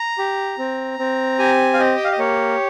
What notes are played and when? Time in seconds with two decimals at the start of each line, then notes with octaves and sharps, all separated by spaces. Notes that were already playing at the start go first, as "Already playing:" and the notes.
Already playing: A#5
0.18 G4
0.58 C4
0.99 C4
1.39 G4 G#5
1.74 F5
1.78 G4 D#5
1.96 G5
2.05 F5
2.12 D#5
2.19 A#3 C#5